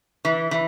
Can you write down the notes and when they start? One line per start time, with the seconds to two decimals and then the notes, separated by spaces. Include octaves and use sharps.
0.25 E3
0.51 E3